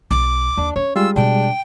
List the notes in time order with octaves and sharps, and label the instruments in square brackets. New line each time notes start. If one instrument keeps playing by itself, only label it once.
[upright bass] B1 [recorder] D6
[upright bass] D#2 [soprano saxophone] D4
[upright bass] C#4 [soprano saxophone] C#5
[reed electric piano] G3 G#3 G#4 [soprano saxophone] F4 [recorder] E6
[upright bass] B2 [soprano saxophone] D4 [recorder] G5